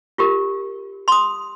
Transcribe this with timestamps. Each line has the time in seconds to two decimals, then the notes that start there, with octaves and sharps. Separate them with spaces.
0.18 F4 G4 A#4
1.08 C6 D#6